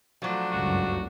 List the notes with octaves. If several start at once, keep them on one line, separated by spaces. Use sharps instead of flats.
F3 F#3 A3 D4
F#1 C#2 G2 F#4